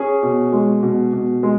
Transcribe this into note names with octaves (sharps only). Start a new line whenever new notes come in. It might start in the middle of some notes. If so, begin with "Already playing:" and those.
Already playing: C#4 G#4
B2
G#3
B2
B2
G#3